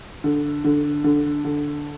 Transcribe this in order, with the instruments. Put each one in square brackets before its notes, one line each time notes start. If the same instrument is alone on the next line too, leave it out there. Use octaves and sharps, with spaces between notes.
[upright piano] D3
D3
D3
D3